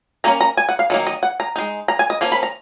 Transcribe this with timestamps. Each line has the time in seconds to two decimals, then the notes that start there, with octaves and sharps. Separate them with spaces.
0.24 D#3 A#3 C#4 A#5
0.41 A#5
0.57 G#5
0.69 F#5
0.79 F5
0.90 D#3 F#3 A#3
1.07 D#5
1.23 F#5
1.40 A#5
1.56 G#3 D#4
1.88 A#5
1.99 G#5
2.10 D#5
2.21 F3 A#3 C#4
2.32 B5
2.43 A#5